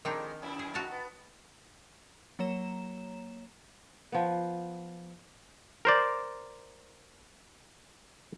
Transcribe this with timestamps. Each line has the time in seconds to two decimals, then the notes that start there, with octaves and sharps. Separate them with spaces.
0.05 F2 D#3 G#3 C4 D4 D#4
0.42 F#2 A#2 E4
0.59 G#4
0.74 F#4 A5 A#5
0.91 B3
2.39 F#3 A#3 C#5 A#5 E7
4.12 F3 B3
5.85 A#4 C5 D5